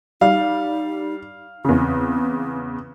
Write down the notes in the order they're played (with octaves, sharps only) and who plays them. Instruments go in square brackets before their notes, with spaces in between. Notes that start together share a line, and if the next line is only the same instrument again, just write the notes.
[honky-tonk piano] G3 [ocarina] D#4 [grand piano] F5
[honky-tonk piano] E2 C#3 [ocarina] C4